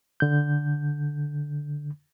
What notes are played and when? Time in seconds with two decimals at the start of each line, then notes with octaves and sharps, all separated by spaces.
0.20 D3 G6